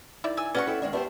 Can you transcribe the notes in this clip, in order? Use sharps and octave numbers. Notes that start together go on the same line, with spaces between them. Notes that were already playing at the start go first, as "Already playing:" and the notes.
D#3 E4 D5
G#5 E6
C#4 F#4 G#4 B4 D5 F#5 C#6
E4 A4 G5
D#3 G#3 D4
A3 B3 G4 C5